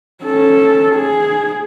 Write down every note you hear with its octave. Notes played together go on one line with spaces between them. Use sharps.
C#4 A4
G#4